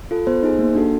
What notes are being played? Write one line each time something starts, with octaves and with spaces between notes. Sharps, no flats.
F4 A4
B3 C5
D#4 G#4
A#3
D4 F#4 A4